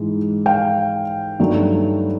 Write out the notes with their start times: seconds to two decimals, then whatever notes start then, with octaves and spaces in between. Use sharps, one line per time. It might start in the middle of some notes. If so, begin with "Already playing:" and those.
Already playing: G#2 E3 G#3
0.46 F5 G5
1.39 G2 D#3 F#3 A3